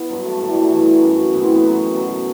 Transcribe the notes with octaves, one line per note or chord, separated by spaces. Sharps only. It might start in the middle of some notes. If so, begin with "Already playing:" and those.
Already playing: B3 E4
G2 F#3
A3
A2 F#3 A3
G3
A3
E3
G2
F#2 F#3
A2 E3 B3
C4
B3
F#2 F#3
B2 F#3